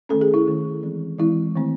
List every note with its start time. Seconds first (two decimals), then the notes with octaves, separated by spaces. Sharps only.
0.09 D#3 A3 C#4 A4
0.21 G#4
0.34 E4
0.46 D#3 A3 C#4
0.83 E3 G#3 C4
1.18 E3 G#3 C4 E4
1.56 D#3 A3 C4